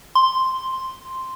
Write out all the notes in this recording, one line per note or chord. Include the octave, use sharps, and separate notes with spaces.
C6